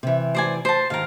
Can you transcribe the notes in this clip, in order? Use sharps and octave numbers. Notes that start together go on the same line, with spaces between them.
C3 E3
C5 D5 G#5
C5 A5
G#2 D#3 A#4 F5